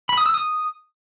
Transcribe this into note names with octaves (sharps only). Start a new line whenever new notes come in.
B5
D#6
E6
D#6